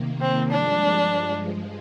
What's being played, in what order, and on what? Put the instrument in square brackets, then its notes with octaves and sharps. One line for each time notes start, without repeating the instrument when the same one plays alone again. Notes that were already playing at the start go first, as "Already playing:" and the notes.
Already playing: [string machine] C3 D#3 A#3
[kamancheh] C4
[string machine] G2 F3 G#3 [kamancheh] D4